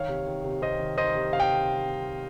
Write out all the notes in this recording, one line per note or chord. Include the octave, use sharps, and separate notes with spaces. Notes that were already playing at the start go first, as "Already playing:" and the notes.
Already playing: D#3 C#5 F5
C3
D#3
C3
C3 C5 D#5
D#3
D#3 C5 D#5
C3
C3 F5
G5